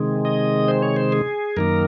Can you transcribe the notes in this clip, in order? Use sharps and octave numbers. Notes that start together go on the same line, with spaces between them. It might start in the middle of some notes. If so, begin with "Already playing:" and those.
Already playing: C3 D#3 G#3
D#5
C5
C#5
C5
G#4
F#2 D#3 A#3 A#4